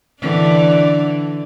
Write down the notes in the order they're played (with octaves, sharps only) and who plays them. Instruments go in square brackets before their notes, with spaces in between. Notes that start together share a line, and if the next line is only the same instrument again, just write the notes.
[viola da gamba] D3 E3 D4